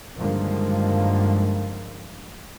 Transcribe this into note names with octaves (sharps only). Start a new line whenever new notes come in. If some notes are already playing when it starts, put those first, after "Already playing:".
G2 D3 D#3 F3 G#3 A#3